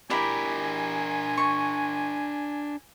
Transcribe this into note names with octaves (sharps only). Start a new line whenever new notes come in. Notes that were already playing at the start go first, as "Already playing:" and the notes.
D4 E4 G4 A#4 G#5
C#6